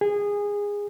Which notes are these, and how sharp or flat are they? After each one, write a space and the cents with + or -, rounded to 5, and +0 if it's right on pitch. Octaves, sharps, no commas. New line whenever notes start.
G#4 -20